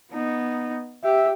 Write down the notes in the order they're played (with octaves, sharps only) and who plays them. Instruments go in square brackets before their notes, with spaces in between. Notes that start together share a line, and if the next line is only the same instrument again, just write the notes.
[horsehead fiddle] B3 D#4
[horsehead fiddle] G4 [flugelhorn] E5